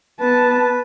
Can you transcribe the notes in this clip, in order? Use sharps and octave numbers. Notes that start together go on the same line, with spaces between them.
B3 B4 A5